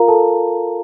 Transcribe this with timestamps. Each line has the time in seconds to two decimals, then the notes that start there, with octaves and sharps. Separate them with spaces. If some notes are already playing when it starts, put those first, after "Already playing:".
Already playing: F4 A#4 F5 A#5
0.08 A4 A5